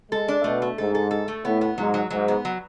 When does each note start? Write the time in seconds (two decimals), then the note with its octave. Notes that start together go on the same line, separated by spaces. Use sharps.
0.11 G#3 A4
0.28 D4
0.44 B2 A3
0.62 A3
0.78 G#2 A4
0.95 A4
1.11 A4
1.28 A3
1.45 A2 B3
1.61 B3
1.78 G#2 F#3
1.94 F#3
2.10 G#2 F#3
2.28 B3
2.45 F#3